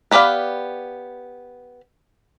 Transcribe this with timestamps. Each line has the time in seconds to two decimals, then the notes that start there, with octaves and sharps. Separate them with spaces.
0.11 B3 G4 B4 D5 F5